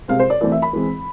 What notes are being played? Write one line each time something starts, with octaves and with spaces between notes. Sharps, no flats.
C3 G#3 C4 F5
C5
D5
E3 A3 C4 D5
E5
B5
E3 G#3 C4